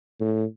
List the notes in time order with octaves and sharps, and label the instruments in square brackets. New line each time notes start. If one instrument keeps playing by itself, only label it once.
[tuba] A2